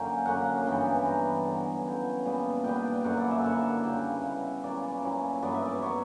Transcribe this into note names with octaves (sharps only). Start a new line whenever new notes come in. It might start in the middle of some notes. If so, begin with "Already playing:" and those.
Already playing: F#2 D3 F#3 A#3 C#4 G5
F#2 D3 A#3 C#4 F#5
G2 E3 B3 D4 G5
G2 E3 B3 D4 A#5
D3 F#3 C#4 E4
D3 F#3 C#4 E4 G5
A#2 G3 B3 D4
A#2 G3 B3 D4 G5
F#2 D3 A#3 E4 F#5
D5
E5
F#2 D3 A#3 E4 F#5
C#3 G3 B3 E4 G5
C#3 G3 B3 E4 F#5
E5
A#2 F#3 C#4 E4 D5
A#2 F#3 C#4 E4
G2 F#3 B3 D5
E5
D5
F#3 B3 C#5